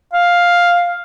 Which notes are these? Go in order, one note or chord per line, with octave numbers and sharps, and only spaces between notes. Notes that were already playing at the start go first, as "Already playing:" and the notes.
F5